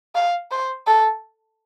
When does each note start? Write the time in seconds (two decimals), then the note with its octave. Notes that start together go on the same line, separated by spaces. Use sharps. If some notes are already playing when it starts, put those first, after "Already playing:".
0.15 F5
0.51 C5
0.87 A4